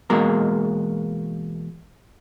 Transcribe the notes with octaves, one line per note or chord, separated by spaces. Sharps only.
E2 B2 G#3 A#3 F#4 A#4